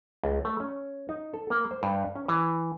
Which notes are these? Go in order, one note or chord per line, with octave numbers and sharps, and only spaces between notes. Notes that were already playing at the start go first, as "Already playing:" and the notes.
C#2
A3
C#4
D#4
A4
A#3
C5
G2
C#4
E3